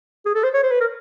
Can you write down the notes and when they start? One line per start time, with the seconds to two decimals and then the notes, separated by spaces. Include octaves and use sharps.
0.26 G#4
0.35 A4
0.43 C5
0.54 C#5
0.63 C5
0.71 B4
0.80 A#4